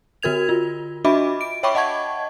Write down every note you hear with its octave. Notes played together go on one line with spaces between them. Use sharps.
D3 F#4 A#4 G#6 F7
F4
D4 F#4 D#5 E5 B5 D6
D7
C#5 E5 G5 B5 C#6 D6
D#5 F#5 A5 C#6 G#6